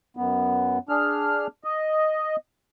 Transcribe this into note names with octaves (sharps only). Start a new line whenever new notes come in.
F#2 B3
D4 G#4 F6
D#5